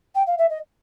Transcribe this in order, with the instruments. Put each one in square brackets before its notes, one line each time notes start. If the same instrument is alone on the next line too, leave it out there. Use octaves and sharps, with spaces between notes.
[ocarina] G5
F5
E5
D#5